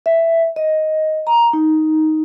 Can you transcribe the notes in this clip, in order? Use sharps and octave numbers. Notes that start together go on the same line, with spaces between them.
E5
D#5
A#5
D#4